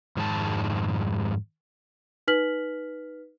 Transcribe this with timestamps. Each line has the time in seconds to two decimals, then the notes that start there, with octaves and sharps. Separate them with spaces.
0.17 F2 G#2 D#3 G#3 F#4 A5
2.28 D#4 B4 F6 B6 F#7